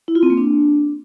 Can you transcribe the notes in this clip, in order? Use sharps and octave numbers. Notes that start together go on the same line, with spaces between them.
E4
F4
C4
A#3
D4